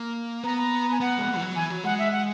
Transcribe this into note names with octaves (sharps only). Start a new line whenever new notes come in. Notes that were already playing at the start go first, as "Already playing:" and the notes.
Already playing: A#3
B3 A#5
A#5
G#5
B3 F#5
G#3
A#3
E3
F#3
E3 G#5
F#3
G#3 F#5
E5
F#5